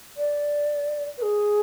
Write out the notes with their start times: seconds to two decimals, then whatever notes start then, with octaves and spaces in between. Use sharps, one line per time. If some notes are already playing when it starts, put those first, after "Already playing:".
0.17 D5
1.18 B4
1.22 G#4